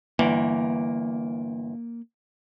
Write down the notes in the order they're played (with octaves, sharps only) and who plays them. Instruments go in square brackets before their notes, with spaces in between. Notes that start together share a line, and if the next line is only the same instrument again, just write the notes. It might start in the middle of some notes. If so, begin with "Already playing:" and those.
[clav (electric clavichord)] G1 E3 [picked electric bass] A#3